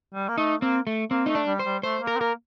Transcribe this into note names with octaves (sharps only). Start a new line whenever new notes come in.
G3
A#3
A3 D#4
A#3 C4
A3
A#3 C4
A3 D#4
D4
G3
C5
G3
A3 C5
A#3
A#4
C4
A#3 A#4